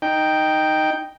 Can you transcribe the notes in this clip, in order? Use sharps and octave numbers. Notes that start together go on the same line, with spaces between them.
D#4 G5